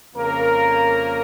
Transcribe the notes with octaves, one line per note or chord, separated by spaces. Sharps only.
F2 C#3 A#3 A#4